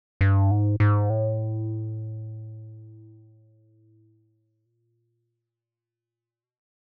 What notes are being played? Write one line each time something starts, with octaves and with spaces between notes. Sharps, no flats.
G2
G#2
G#2
A2
A#2
B2